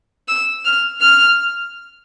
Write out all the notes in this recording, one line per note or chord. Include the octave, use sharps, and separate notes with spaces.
E6
F6
F6